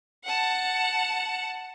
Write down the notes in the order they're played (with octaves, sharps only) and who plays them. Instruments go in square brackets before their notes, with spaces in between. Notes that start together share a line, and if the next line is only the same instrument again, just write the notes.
[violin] F#5 A5